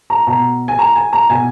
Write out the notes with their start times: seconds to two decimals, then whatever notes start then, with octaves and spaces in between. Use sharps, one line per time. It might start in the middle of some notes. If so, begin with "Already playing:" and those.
0.10 A#5
0.27 B2 A#5
0.68 G#5
0.79 A#5
0.96 G#5
1.13 A#5
1.30 B2 G#5